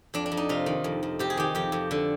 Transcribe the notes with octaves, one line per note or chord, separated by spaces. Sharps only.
F2 D4
D4
F2
D#4
C3 F4
D#3
F2
F2
C3 G4
G#4
D#3 G4
F2 G4
F2
D3